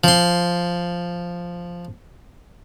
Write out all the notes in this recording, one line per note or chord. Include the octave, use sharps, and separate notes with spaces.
F3 C6